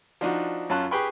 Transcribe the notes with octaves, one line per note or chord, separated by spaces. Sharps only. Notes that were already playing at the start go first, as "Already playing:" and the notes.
F3 D4 D#4 F#4
F#2 C#4 F4 A5 F#6
G4 G#4 B4 G5 B5 C#6